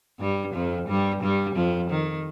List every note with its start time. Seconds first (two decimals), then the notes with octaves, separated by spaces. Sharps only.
0.20 G2 G3
0.54 F2 F3
0.88 G2 G3
1.22 G2 G3
1.56 F2 F3
1.90 D#3